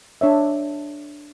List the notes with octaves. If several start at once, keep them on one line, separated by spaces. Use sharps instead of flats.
D4 C#5 E5